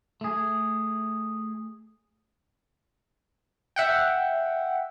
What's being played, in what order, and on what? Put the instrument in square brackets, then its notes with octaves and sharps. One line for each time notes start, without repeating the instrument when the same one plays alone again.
[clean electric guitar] A3 G#4
[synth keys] E5 F#5 G5